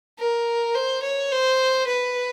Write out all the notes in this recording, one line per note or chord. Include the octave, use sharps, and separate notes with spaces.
A#4
C5
C#5
C5
B4